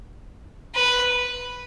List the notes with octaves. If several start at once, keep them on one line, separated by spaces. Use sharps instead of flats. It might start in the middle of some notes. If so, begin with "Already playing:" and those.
B4